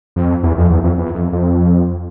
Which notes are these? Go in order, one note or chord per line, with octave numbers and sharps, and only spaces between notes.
F2
E2
F2
E2
F2
E2
F2
F2